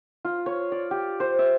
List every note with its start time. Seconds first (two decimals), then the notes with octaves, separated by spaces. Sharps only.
0.25 F4
0.46 C#5
0.72 D5
0.91 G4
1.20 C5
1.39 E5